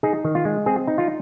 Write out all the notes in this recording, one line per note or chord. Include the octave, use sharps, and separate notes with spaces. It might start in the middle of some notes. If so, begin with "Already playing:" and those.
D#4 G#4
D#3
F4
G#3
C4 G#4
D#4
F4